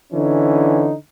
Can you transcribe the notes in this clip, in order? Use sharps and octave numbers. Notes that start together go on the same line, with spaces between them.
D3 E3 C#4 D#4